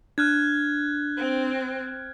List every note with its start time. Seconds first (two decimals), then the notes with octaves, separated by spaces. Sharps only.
0.18 D4 F6 F#6 G#6
1.16 C4